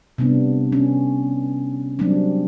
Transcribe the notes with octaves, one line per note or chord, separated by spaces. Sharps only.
C3 G3 B3 D4
C#4
F#3 G3 A#3 C4 D4